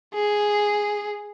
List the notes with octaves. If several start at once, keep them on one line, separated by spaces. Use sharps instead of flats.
G#4